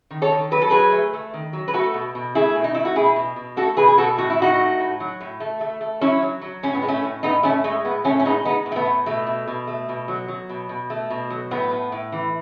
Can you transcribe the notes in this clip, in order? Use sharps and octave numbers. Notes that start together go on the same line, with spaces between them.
D#3
A4 C#5
D#3
F#3 B4
A4
F#3 G#4 B4
A3
A3
D#3
F#3
B4
A3 F#4 A4
B2
B2
A3 E4 G#4
B2
D#4
A3 E4
F#4
B2 E4 G#4
B2
B2
A3 F#4 A4
B2 G#4 B4
G#4
B2 F#4 A4
A2 F#4
E4
A2 D#4 F#4
A3
A2
F#3
A2
A3
A3
A3
F#3 C#4 E4
F#3
F#3
A2 C#4
B3
G#3
A3 C#4
A2
A2 B3 D#4
A2 A3 C#4
G#3 A3
A2 B3
A2 A3 C#4
C#4
G#3 B3 D#4
G#3 B3 D#4
A2
A3
B3
A2
B2 A3
B2
B2
A3
B2
F#3
F#3
B2
B2
A3
B2
F#3
A2 B3
A2
A2
E3